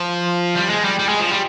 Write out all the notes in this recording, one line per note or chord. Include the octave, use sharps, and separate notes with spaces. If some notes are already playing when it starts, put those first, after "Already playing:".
Already playing: F3
G3
G#3
G3
G3
G#3
F3
G3